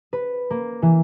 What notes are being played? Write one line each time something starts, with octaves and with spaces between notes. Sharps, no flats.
B4
A#3
E3